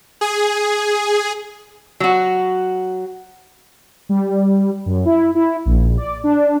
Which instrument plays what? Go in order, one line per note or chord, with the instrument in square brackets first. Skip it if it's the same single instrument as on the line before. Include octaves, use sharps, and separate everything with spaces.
[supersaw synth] G#4
[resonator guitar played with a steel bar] F#3 F#4
[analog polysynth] G3
F#2
E4
E4
A#1
D5
D4